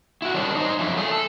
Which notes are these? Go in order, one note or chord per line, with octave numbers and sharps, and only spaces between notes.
E4 F#4
D#3 G3 C#4 D4 D5
D#4 C5
F#2 F3 D4 E5
A3 G#4
A4